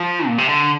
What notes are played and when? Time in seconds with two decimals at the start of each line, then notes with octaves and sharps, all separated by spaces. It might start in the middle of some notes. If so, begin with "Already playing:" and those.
Already playing: F3
0.27 A#2
0.38 C3
0.49 D3